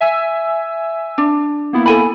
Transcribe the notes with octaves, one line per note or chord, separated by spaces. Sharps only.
E5 G#5 E6
D4
A#3 B3 E4
A4 G#5 B5